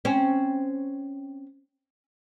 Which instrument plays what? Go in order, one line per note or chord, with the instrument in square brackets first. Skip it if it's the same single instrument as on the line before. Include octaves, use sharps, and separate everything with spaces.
[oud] C4 C#4